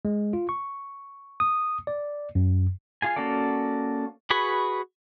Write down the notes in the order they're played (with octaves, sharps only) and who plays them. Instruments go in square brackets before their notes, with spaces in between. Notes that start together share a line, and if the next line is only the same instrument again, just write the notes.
[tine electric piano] G#3
F4
C#6
D#6
D5
F#2
[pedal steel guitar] F4 G#4 G#5
A#3 C#4 F#4 A4 D5
F#4 G#4 B4 B5 C#6